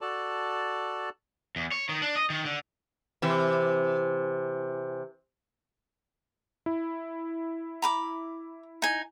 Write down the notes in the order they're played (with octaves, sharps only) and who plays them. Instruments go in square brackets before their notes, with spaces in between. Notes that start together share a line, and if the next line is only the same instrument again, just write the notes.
[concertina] F#4 A4 D5 A5
[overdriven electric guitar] E2
C#5
D#3
D4
D#5
D#3
D3
[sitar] C3 E3
[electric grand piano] E4
[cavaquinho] A#5 B5 D6
D#4 G#5